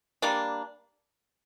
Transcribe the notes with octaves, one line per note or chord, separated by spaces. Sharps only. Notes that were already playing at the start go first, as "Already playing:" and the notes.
G3 A#3 D4